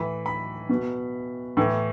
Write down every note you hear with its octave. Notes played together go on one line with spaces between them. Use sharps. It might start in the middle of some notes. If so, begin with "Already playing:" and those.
Already playing: A2 E3 B5
B5
B2
A2 E3